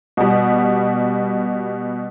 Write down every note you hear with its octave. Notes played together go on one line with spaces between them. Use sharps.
B2 G3